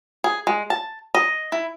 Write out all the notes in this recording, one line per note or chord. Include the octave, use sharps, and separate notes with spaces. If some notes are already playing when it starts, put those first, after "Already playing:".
G#4
G#3
A5
D#5
E4